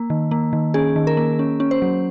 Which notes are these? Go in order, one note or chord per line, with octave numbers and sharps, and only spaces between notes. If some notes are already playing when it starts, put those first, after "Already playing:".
Already playing: A#3
D#3
A#3
D#3
C#4 G#4
D#3
A#4
A#3
C#4
C#4
C5
F#3